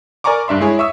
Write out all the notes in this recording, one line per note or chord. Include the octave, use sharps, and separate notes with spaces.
A#4 D5 G#5 A#5 C#6 D6
G2 D4 E5 C6
G#3 E4 G#4 C#5
E5 C#6 D#6 E6